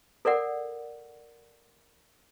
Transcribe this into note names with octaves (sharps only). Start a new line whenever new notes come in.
A4 A#4 D5 F#5